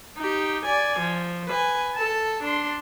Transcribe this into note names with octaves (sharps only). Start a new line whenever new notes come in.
D#4 G4
D5 G#5
F3
B4 G#5
A4 A5
D4 C6